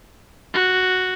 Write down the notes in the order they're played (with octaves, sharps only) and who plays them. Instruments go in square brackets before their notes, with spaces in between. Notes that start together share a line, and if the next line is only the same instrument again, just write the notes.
[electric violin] F#4